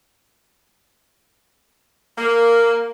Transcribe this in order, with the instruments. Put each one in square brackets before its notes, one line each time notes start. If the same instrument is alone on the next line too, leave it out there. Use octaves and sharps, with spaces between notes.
[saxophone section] A#3